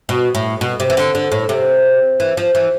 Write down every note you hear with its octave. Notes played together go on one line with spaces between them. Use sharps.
B2
A2
B2
C3
E3
D3
D3
A2
C3
E3
F3
E3